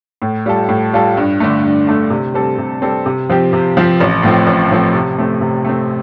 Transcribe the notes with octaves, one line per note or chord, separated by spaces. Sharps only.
A2
G3 F4 A4
A2
G3 F4 A4
G2
D3 A3
G2
D3 A3
C3
G3 C4 A4
C3
G3 C4 A4
C3
F3 C4 G4
C3
F3 C4 G4
A1
A2 F3 C4
A1
A2 F3 C4
C3
A3 C4
C3
A3 C4